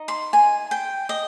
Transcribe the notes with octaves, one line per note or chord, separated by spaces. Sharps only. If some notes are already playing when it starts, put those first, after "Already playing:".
Already playing: D#4 D#5
C6
G#5
G5
D#5